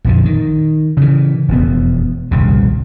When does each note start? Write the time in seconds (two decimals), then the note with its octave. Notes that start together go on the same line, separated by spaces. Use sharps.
0.05 A#1 F2 D3
0.25 D#3
0.97 C#3 E3
1.48 E1 F2 B3
2.31 D#1 C2 F2 C#3